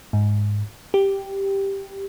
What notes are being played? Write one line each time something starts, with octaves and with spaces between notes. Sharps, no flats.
G#2
G4